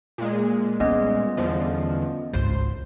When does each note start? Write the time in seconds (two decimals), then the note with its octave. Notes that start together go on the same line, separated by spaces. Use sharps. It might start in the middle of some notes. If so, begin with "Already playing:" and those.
0.18 A#2 G#3
0.80 G3 B3 C#4 D#5
1.37 E2 D3 F3
2.33 G#1 C#2 C5